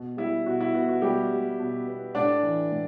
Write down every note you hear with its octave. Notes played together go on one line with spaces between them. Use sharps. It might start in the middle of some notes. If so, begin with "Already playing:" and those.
Already playing: B2
G3 E4
B2 F#4
E4
B3 F#4
F#4
B2 G3 G4
G3
B2
B3
A2 D4 D5
E3
A2